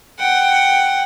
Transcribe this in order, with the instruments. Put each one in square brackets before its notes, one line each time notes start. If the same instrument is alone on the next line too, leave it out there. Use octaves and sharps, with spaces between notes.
[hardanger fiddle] F#5 G5